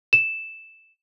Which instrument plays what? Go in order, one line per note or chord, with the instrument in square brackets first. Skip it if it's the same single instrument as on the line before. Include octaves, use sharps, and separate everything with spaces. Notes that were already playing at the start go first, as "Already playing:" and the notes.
[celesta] E7